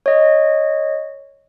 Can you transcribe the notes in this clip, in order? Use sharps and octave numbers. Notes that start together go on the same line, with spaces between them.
C#5 D#5